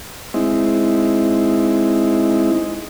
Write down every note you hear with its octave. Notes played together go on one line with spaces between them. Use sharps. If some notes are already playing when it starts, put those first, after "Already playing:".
G#3 C4 D#4 E4